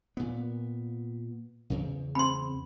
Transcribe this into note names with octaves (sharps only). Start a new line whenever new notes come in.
A#2 B3
E2 C#3
C4 B5 C6